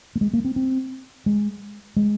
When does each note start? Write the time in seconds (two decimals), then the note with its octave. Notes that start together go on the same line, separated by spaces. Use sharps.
0.16 A#3
0.21 G#3
0.33 A#3
0.45 C4
0.56 C4
1.26 G#3
1.96 G#3